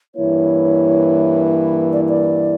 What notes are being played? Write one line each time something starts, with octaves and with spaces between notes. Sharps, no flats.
G2 E3 A#3 E4 C#5
D5
D5